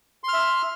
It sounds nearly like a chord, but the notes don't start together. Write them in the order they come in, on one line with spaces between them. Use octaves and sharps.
C6 F6 E5